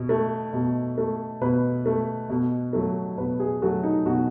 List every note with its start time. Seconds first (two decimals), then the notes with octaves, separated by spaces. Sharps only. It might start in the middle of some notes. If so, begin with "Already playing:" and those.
Already playing: B2
0.09 A3
0.53 B2
0.98 A3
1.41 B2 B4
1.86 A3
2.30 B2
2.73 F#3 A3
3.18 B2 B4
3.40 G#4
3.62 F#3 A3 F#4
3.83 D#4
4.06 B2 F#4